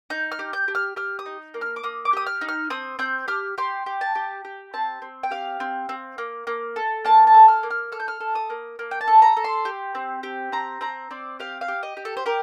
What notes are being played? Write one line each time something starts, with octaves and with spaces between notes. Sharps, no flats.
D#4 G6
F6
G4
G6
G4
F6
G4 F6
D#6
D#4
A#3
F6
D6
A#3 D#6
D6
G4 D#6
F6
D#4
F6
C4 D#6
C4 G6
G4 F6
G4 C6
G4
A5
G4
G4
C4 A5
C4
G5
G4 F5
C4
C4
A#3
A#3
A4
A#3 A5
A5
A4
F6
A#3
F6
A4 F6
G6
F6
A4
D#6
A#3
A#3
G5
A5
A4
A#5
A4
C6
G4
C4
G4
C4 A#5
C4 A#5
C4 D5
G4 F5
F5
G4
D#5
G4
A4
C5
G4 A#4